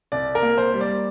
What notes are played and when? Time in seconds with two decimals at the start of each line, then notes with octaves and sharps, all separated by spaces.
0.12 C2 D5
0.35 A#4
0.42 A#3
0.58 C5
0.74 G3
0.81 D5